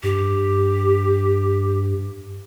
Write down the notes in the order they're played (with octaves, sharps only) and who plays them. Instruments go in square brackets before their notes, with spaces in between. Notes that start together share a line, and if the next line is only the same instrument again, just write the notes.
[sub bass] G2 [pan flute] G4